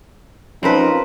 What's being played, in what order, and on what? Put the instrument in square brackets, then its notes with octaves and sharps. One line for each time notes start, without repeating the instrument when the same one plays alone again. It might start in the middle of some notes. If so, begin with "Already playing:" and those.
[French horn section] F3 C#4 D#4 [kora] C4 A#4 B4